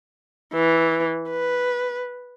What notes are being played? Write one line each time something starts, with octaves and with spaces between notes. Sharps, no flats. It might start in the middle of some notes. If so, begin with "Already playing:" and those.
E3
B4